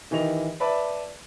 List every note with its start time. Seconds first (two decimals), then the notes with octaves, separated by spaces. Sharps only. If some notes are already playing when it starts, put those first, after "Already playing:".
0.11 D#3 E3 G4 D#5 F7
0.60 B4 D5 E5 A5 B5